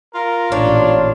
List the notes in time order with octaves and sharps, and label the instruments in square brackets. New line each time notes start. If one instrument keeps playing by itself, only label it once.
[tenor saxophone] F4 [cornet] A#4
[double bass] A1 A#2 [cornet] D4 [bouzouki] C#5